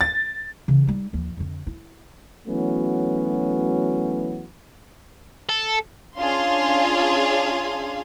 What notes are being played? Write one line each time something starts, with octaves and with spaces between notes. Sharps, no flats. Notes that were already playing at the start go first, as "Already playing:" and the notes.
A6
C#3 E3
G3 D#4
D#2 F3
F2 D3
E4
E3 F#3 A3 B3 C#4 F#4
A4
C#4 D4 F4 G#4 F5 C6